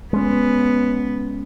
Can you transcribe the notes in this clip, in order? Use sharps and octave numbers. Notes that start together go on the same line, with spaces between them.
G#3 B3 C#4